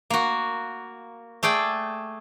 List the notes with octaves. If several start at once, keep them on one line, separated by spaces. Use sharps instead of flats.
A#3 F#4
A3 G#4 D5 G5